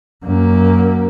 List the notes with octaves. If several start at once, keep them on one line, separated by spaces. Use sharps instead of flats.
F#2 A#3